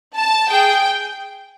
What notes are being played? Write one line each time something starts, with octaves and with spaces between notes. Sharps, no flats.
A5
G#4 G5